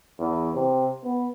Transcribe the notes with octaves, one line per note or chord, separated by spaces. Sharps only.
E2
C3
B3